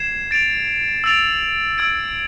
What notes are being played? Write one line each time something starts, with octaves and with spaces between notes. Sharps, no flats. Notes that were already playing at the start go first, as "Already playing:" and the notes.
Already playing: G#6 C7 E7
A6 D7 F7
E6 A6 D7 F7
E6 G#6 D7